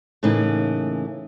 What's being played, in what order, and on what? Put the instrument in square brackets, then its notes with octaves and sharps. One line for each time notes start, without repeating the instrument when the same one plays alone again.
[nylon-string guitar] A2 C#3 E3 A#3 D#4